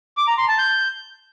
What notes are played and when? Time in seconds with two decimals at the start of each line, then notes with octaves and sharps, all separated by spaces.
0.17 D6
0.28 A#5
0.38 C6
0.48 A5
0.58 G6